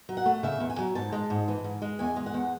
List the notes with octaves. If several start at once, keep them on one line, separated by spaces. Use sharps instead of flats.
F#3
F#5
A3
C#3 E5
E2
G#5
F#3
G#2 A5
G#3
G#2
E3
G#2
G#3
E2 G#5
G#3
F#5
E2